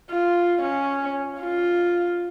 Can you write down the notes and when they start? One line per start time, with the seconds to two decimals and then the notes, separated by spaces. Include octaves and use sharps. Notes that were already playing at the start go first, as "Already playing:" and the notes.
0.11 F4
0.62 C#4
1.40 F4